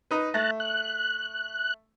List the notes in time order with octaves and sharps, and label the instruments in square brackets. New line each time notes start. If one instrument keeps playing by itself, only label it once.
[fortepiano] D#4 B4
[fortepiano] A3 [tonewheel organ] A5 A#5 F#6
[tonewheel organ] F#6